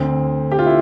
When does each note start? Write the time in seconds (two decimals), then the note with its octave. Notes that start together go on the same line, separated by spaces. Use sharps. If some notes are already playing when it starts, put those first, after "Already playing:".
Already playing: D2 D3 C4
0.52 G4
0.59 F4
0.66 E4